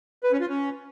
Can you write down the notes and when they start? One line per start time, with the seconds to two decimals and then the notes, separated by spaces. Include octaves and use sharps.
0.24 B4
0.32 C#4
0.40 F4
0.49 C#4